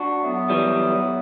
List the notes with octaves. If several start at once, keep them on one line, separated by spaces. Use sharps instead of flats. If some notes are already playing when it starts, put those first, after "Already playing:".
Already playing: D4 F#4
A2 F#3 B3 E4
E3 G3